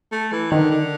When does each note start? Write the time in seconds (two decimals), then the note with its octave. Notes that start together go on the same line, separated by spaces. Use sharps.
0.12 A3
0.32 E3
0.52 D3 D#3
0.71 D3